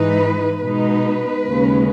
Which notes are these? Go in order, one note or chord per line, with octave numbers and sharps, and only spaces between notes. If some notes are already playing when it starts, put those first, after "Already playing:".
Already playing: G#2 E3 G#3 D#4 B4
B2 G#3 D#4 B4
D#2 C#3 G#3 C#4